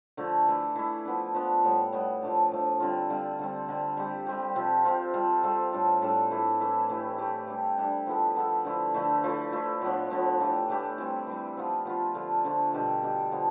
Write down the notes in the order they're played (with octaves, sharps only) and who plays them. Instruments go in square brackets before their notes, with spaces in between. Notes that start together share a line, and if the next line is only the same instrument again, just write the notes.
[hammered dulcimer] D3 F3 A3
E3 A3 E4
E3 A3 E4
F3 B3 D4
F3 B3 D4
A2 G3 B3
A2 G3 B3
F3 A3 D4
F3 A3 D4
D3 G3 C4 F4
D3 G3 C4 F4
D3 G3 C4
D3 G3 C4
G3 C4 G4
G3 C4 G4
C3 F3 C4 F4
C3 F3 C4 F4
G3 C4 F4 A4
G3 C4 F4 A4
A2 G3 D4 A4
A2 G3 D4 A4
E3 A3 E4 A4
E3 A3 E4 A4
E3 A3 E4 G4
E3 A3 E4 G4
G3 D4 G4
G3 D4 G4
F3 B3 E4 A4
F3 B3 E4 A4
D3 F3 A3 E4
D3 F3 A3 E4
F3 A3 E4
F3 A3 E4
A2 F3 B3 D4
A2 F3 B3 D4
E3 A3 D4 G4
E3 A3 D4 G4
E3 G3 C4
E3 G3 C4
F3 B3 F4
F3 B3 F4
D3 F3 A3 D4
D3 F3 A3 D4
B2 G3 D4 G4
B2 G3 D4 G4
D3 F3 B3